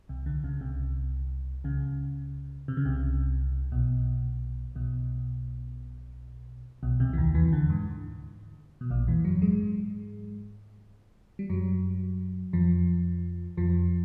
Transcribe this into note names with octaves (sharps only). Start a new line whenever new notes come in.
C2 C3
D2 D3
C#2 C#3
C2 C3
C#2 C#3
C3
C#3
C2 C3
B1 B2
B1 B2
B1 B2
C2 C3
E3
D#2 D#3
E2 E3
D2 D3
G#2
B2
A#1 A#2
E2 E3
F#2 F#3
G#2 G#3
G3
F#2 F#3
F2 F3
F2 F3